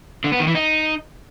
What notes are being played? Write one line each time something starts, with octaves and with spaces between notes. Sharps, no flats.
D3
B3
D#3
E3
D#4